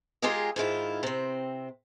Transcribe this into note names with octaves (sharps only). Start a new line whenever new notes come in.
G#3 F4 G4 G#4 A#4 D#5
G#2 D#3 E4 F4
C3 C4